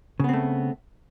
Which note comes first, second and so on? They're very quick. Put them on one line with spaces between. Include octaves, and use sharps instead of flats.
C#3 B3 C4 A3